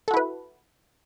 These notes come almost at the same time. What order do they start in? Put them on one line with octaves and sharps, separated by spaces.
A4 F#4 E4 B4